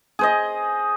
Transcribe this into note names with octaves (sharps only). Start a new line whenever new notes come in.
G#4 C5 D#5